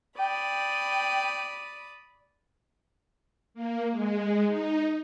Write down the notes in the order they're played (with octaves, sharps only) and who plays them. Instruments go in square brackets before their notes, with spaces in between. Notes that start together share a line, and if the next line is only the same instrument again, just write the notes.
[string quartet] D5 B5 D#6 [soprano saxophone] G5
[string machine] A#3
G#3
D#4